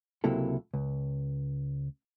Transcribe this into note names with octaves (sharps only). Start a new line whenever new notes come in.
C#2 C3 F#3 A#3 E4 A4
C#2